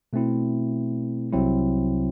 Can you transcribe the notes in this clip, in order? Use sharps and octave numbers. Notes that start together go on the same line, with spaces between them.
B2 A3 C4 E4
C2 C3 F#3 C4 E4